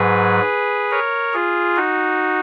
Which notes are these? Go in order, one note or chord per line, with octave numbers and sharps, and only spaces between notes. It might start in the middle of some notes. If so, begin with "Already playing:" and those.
Already playing: G#2 F#3 G#4 B4
A#4 C#5
F4 G#4
D#4 F#4